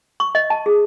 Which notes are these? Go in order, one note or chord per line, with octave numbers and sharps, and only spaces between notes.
C#6
D#5
A5
G#4